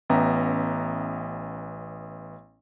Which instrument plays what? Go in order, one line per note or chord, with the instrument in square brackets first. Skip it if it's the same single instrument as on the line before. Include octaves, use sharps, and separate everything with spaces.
[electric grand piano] A1 B3 C#4 E5 G5 A#5